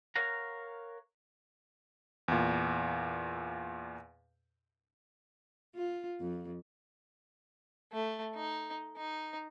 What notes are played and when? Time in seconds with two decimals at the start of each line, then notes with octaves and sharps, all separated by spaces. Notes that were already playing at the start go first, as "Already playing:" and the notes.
0.16 A#4 C#5 F5 F#5 A#5
2.28 E2 A#2
5.75 F4
6.20 F2
7.92 A3
8.35 D#4
8.97 D#4